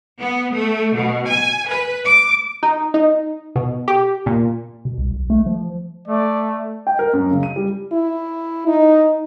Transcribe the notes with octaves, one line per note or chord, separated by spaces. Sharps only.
B3
A3
B2
G#5
B4
D6
D#4
D#4
B2
G4
A#2
B2
C2
B1
A3
F3
A3 D5
G5
A#4
F#2
C#3
D#7
G3
E4
D#4